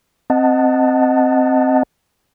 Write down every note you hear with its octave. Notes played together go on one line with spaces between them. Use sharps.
C4 D#5 F#5 A5